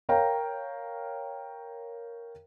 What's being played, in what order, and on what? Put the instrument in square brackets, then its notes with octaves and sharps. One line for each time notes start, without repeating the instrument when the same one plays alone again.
[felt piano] A#4 C#5 F5 G5 A#5